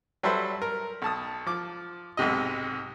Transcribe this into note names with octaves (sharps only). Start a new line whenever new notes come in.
F#3 G3 A4 B4 C5 E5
A#4
B1 A5 D#6
F3 D6
B1 G#2 C3 D#5